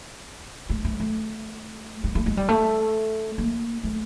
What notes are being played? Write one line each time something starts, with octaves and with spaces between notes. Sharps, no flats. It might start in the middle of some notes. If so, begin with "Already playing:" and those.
A3
A3
A3
G#3
A3
G#3
G3
A3
A#3
A3